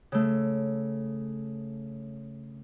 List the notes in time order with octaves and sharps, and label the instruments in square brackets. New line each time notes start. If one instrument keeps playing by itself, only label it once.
[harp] C#3 A3